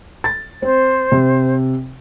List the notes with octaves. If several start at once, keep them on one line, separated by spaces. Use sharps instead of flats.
A6
C4 C5
C3